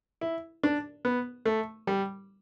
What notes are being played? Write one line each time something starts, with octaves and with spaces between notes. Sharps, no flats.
E4
D4
B3
A3
G3